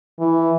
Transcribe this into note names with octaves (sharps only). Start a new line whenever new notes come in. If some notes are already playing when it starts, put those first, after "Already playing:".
E3